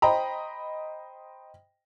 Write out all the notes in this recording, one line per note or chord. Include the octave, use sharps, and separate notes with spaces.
C5 D#5 G5 A#5 B5